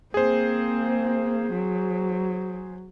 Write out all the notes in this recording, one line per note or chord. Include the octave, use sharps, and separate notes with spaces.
A#3 C4 G#4 C5
F#3